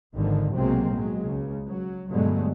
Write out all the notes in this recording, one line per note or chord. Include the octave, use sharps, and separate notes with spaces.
G#1 D3 D#3 F3
B1 C3 F#3 G#3 A#3 C4
A2 F#3 G#3
C#2 C#3
F#3
G2 B2 D3 F#3 G#3 A3